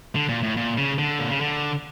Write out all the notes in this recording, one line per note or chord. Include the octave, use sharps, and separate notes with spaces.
D3
A#2
A2
A#2
C#3
D3
A#2
C#3
D3